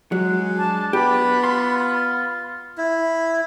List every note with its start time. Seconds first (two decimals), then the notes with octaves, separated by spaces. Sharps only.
0.12 F#3 G#3 F#5
0.58 D4 A5
0.93 B3 G4 B5
1.44 F4 C6
2.78 E4